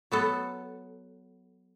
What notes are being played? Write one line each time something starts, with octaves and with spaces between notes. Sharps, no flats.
F#3 B3 A4